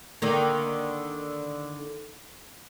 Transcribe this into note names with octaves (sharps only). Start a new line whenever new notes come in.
D3 D#3 A#3